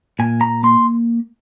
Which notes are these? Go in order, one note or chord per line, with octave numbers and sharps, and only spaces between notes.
A#2 G#5
A#5
A#3 C6